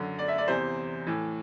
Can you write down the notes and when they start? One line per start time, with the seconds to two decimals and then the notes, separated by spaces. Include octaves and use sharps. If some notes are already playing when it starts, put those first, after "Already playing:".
Already playing: F#2 D3
0.19 D5
0.28 E5
0.38 D5
0.48 E2 C3 E3 C5
1.07 A2 E3